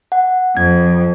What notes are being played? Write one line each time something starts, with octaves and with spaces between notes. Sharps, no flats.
F#5
F2 G#6